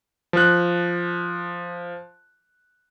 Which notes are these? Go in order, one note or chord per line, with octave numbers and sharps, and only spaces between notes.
F3 F#6